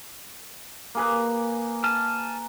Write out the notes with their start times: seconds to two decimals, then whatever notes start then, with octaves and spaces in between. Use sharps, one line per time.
0.95 A#3 G#4 B4
1.84 G#5 A5 F6